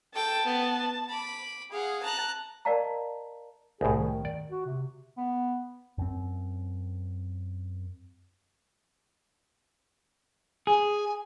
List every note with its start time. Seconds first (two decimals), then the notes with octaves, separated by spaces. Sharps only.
0.15 A4 G5 A5
0.45 B3
1.09 B5 D6
1.72 G#4 F5 F#5
2.03 A5 A#5 F#6
2.65 A#4 D5 D#5 F5 A5 A#5
3.81 C2 A2 G#4
3.95 D#3
4.25 D5
4.51 F#4
4.66 C3
5.17 B3
5.98 F#2 C4
10.67 G#4 G#5